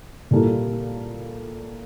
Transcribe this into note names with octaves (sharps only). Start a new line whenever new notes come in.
A#2 G3 A#3 E4 A4